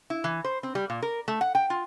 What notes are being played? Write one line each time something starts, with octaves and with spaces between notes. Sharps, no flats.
E4
E3
C5
C4
G3
A#2
A#4
A3
F#5
G5
F4